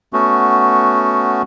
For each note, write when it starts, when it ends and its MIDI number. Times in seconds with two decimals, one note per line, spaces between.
0.13 1.42 57
0.13 1.42 59
0.13 1.42 61
0.13 1.42 66